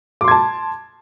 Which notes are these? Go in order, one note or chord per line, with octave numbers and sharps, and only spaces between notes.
A5 C6 D6 G#6